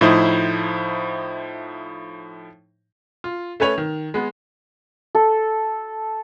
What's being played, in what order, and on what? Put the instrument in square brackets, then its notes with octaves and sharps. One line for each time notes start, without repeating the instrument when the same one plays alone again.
[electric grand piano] A2 F3 D#4 E4 C5 D#6
[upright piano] F4
A3 C#4 B4 C#5 F7
D#3
G#3 B3
[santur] A4